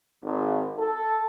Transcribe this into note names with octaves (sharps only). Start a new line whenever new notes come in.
G#1
A4